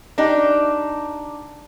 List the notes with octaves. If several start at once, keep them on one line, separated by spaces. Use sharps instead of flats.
D4 D#4 G4